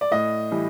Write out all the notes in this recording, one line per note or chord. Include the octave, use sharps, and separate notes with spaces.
D5
A2 D#5
E3 G3